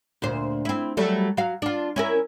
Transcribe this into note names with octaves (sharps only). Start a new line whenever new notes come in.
D2 A#2 C5
C4 E4
F#3 G3 A3
F#3 F5
D4 F4
C#4 E4 A#4